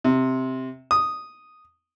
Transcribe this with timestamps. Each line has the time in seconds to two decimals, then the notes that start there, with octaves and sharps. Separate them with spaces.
0.04 C3
0.91 D#6